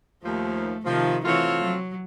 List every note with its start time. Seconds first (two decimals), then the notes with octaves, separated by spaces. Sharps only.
0.24 D#2 F3 A3
0.85 C3 D#3 F3
1.25 E3 A3 C4 F4 F#4 C#5
1.62 F#3